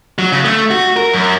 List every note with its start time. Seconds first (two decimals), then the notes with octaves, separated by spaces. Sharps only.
0.18 F#3
0.32 C#3
0.45 A3
0.71 F#4
0.96 A#4
1.13 F#2